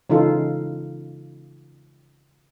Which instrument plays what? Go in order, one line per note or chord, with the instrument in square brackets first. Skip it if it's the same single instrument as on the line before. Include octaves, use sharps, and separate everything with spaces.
[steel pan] C#3 E3 D#4 F4 A4